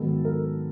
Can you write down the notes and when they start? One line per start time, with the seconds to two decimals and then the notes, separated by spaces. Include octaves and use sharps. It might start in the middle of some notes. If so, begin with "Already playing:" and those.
Already playing: G#2 D#3 F#3 B3 A4
0.25 A#4